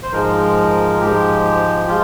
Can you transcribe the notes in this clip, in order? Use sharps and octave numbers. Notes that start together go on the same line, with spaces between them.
C5
G#2 F3 G#3 A#4
G#2 F3 G#3 G4
F3 G#3 F4